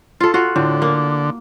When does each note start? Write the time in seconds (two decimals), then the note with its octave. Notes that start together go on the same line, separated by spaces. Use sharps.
0.20 F4 A4
0.34 F4 F#4
0.56 A2 D3
0.82 A#3